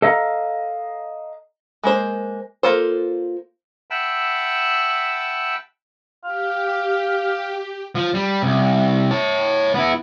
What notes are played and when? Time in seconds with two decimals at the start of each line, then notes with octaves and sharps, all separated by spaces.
0.02 A4 D#5 F5 A#5
1.83 G#3 A#3 C5
2.63 A#3 F4 A4 C5
3.90 E5 F#5 G5 A5 B5 E6
6.24 G4 F5
7.95 F3
8.14 G3
8.43 C2
9.11 C#5 A5
9.74 B3 E4